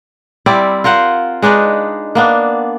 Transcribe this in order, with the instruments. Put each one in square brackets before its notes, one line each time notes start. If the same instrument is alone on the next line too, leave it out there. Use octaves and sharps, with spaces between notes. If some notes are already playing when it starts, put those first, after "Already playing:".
[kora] G3 C4 E4 D5
F4 A#4 C5 F#5
G#3 D4 D#4 B4
A#3 B3 D4